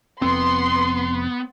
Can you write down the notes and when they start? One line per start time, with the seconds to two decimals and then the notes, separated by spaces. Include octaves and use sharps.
0.22 F1 F2 B3 C4 C6